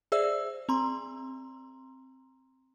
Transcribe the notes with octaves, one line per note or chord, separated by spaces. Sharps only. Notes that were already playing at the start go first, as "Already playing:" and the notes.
G#4 C5 D5 E5 E6
C4 A#5 C6